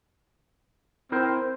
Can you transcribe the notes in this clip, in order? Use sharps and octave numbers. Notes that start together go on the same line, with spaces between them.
C4 E4 A#4 C5